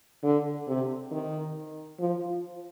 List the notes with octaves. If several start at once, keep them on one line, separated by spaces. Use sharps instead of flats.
D3
C3
D#3
F3